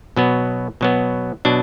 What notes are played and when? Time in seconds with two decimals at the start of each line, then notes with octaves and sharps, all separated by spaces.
0.17 B2 F#3 B3
0.81 B2 F#3 B3
1.45 B2 F#3 D4